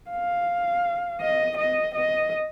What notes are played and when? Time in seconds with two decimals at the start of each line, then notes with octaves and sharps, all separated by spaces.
0.10 F5
1.21 D#5
1.57 D#5
1.94 D#5